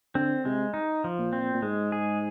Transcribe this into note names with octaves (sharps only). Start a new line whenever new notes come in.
D3 C4
C3 G#3
D#4
F3
A#2
C4
A#2
G#2 G#3
G#4